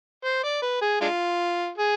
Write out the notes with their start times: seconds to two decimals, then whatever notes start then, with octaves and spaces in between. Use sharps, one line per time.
0.25 C5
0.44 D5
0.62 B4
0.82 G#4
1.01 G#3 D4 F4
1.78 G#4